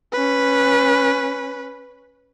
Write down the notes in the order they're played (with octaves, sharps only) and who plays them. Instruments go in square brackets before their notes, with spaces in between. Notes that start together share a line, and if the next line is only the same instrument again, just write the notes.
[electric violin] C#4 B4